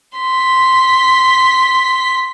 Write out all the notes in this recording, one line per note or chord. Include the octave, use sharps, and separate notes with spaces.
C6 B6